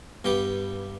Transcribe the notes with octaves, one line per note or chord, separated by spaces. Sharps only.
G2 G3 B3 G4 D6